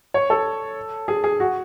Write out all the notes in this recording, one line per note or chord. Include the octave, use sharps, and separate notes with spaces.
C#5
A4
G#4
G#4
F#4